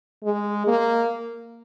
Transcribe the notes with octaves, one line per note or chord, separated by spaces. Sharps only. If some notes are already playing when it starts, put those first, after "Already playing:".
G#3
A#3